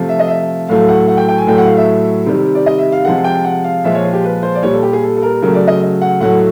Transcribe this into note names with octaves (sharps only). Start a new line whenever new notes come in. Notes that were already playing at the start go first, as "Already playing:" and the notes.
Already playing: C3 F3 A3
E5
D#5
E5
A2 F#3 A3 F5
F#5
F#5
G5
G5
G#5
A2 F#3 A3 G5
F#5
F5
E5
C3 D#3 G3
D5
D#5
E5
F5
C3 F3 G#3 F#5
G5
F#5
F5
A#2 F3 G#3 E5
C#5
G#4
G4
B4
C5
D5
A#2 G3 C#5
A4
G4
G#4
A4
A4
A#4
C#3 F#3 A3 A#4
D5
D#5
F#5
A2 F#3 A3 F#5